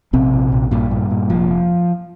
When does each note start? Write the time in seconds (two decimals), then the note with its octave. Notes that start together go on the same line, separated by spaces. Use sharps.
0.13 A#1 C3 C4
0.33 A#2
0.52 A#1
0.71 G2 A#2 G3
0.91 A#2
1.11 A#2
1.30 F1 F3